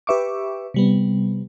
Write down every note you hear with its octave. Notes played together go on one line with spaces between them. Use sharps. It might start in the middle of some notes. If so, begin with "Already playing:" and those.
G4 B4 E5 C#6 D6
C3 G3 B3